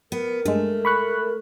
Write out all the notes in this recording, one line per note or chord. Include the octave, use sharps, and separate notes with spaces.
B3 A#4
G2 G#3 A3
B5 C#6 F#6